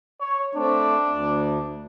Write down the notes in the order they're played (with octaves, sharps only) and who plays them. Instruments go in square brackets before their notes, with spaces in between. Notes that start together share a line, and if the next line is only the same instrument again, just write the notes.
[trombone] C#5
[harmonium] A3 C4 [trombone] D4
[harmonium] D2